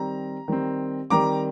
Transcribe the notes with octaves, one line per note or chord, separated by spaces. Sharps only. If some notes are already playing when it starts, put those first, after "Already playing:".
Already playing: D#3 G3 C4 A#5
D#3 G3 C4
D#3 G3 C4 A#5 D6